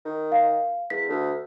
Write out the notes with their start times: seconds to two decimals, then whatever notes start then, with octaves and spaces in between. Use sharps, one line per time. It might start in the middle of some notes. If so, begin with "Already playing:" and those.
0.05 D#3
0.32 F5
0.90 E2 B6
1.09 D2